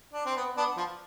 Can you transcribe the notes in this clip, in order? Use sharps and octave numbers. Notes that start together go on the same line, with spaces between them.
D4
C4
B3
B3 D4
F3